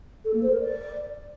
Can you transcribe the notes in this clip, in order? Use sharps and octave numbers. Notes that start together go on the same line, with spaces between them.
A4
A#3
C5
A#4
D5